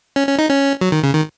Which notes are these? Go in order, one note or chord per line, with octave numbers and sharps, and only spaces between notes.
C#4
C#4
D#4
C#4
F#3
D#3
C#3
D#3